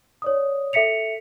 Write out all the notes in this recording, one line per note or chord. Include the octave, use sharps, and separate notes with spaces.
C#5 D5 D#6
A4 E5 B6 C#7 F7